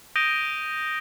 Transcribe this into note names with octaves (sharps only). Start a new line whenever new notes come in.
D#6 G6 A#6 D7 D#7 G7